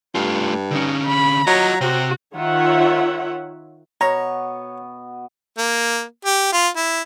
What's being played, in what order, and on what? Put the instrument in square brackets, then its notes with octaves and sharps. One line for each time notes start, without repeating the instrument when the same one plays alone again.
[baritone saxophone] G2 [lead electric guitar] A3 F4
[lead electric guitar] D3 C#4 [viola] D#4
[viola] B5
[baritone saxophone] F#3 [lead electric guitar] F4 D#5 [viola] C#5 A#5
[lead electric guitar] C3 [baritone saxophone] C4 [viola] F#4
[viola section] D#3 F4 C#5 E5 F#5
[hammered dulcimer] B2 B3 F#4 [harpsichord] C#5 [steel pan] A#5
[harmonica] A#3
G4
F4
E4